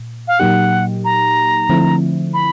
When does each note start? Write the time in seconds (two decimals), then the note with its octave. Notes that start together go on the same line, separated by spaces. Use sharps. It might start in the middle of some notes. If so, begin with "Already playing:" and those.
Already playing: A#2
0.28 F5
0.39 A#2 F#3 A#3 D#4 G4 F#5
1.05 A#5
1.70 D3 F3 A3 C4 E4
2.34 B5